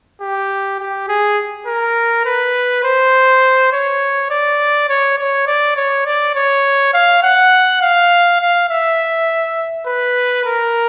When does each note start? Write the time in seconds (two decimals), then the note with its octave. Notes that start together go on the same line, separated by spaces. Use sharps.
0.21 G4
0.79 G4
1.08 G#4
1.67 A#4
2.25 B4
2.84 C5
3.72 C#5
4.31 D5
4.89 C#5
5.19 C#5
5.47 D5
5.76 C#5
6.06 D5
6.35 C#5
6.94 F5
7.23 F#5
7.82 F5
8.41 F5
8.69 E5
9.86 B4
10.45 A#4